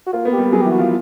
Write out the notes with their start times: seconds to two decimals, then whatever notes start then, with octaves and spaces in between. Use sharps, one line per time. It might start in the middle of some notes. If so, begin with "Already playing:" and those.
0.06 F#4
0.13 A#3 F4
0.25 B3
0.32 G4
0.38 G3
0.52 F#3 G#4
0.62 G4
0.65 E3
0.71 F#4
0.79 F3 F4